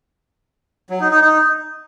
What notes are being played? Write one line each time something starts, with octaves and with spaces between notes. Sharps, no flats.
F#3
D#4
D#4
D#4